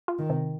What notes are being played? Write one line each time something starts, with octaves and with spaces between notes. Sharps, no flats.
F4
D#3
C3